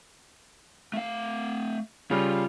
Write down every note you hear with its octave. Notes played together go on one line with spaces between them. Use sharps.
A3 F5
C#3 G3 F4